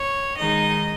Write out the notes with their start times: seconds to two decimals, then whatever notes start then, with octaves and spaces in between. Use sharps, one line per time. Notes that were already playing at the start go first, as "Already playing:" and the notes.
Already playing: C#5
0.38 D#3 G#3 D#4 D#5